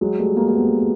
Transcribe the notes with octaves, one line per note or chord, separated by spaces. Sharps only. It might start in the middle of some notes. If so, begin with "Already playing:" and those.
F#3 G#3
G3 A3
G#3 A#3
A#3
A3 B3